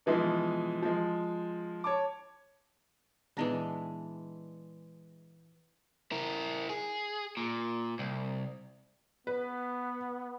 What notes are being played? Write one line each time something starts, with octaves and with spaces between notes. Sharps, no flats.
B2 E3 F3 G#3
F3 G#3
C#5 A5 D6
A#2 E3 G#3 B3 D4 D#4
E4 A#4
G#4
A#2
C2
B3 B4